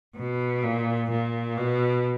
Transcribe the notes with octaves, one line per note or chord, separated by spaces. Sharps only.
B2
A#2
A#2
B2